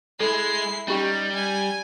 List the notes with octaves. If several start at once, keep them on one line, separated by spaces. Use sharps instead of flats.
G#3 E4 A4 C7
G3 C#4 D#4 G4 G5
G#5